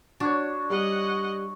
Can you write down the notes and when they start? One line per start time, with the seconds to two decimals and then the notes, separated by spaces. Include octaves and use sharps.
0.20 D4 F#4 C#5
0.70 G3 D#5 F#5